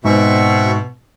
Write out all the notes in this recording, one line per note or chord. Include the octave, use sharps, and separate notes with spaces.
G#2 B2 C4 E5 C#6